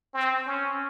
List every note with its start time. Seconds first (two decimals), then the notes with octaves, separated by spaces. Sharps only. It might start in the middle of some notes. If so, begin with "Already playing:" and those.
0.14 C4
0.47 C#4